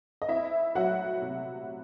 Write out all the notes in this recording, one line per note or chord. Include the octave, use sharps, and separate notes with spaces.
D#5
C4 E4 E5
F#3 F#4 F#5
C3